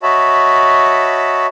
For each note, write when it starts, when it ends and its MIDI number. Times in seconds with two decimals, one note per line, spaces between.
0.03 1.46 66
0.03 1.46 73
0.03 1.46 75
0.03 1.46 76
0.03 1.46 81
0.03 1.46 83